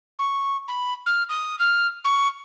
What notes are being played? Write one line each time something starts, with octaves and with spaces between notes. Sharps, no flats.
C#6
B5
F6
D#6
F6
C#6